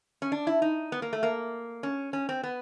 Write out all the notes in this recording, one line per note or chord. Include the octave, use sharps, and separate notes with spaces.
C#4
D4
E4
D#4
B3
A#3
A3
A#3
C#4
C#4
C4
B3